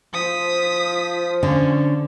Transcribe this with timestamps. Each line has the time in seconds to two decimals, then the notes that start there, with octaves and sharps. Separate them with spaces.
0.14 F3 D#6 B6
1.43 D3 C#4